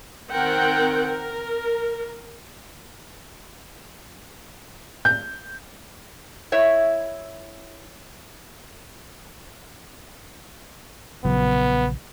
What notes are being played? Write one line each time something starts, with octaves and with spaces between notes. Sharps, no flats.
D#3 C4 A#4 F#5 G5
A#4
G6
E4 C#5 E5
A#1 C#3 F#3 B3